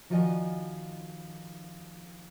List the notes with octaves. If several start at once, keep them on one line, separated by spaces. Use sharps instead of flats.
D#3 F3 F#4 D5 D#5 G#5